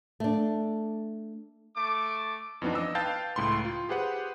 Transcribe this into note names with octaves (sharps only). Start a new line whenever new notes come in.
A3 D4
A3 D6
F2 E3 F3 B3 D4 D#4
D#5 D6 E6
B4 F5 G5 A5 G6 A6
C#2 A2 B5 C6
F4
G4 G#4 B4 C5 F#5